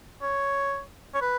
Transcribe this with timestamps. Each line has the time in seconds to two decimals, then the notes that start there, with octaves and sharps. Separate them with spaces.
0.22 C#5
1.14 C#5
1.21 B4